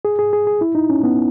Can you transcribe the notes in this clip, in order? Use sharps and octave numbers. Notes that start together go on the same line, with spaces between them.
G#4
G#4
G#4
G#4
E4
D#4
C#4
B3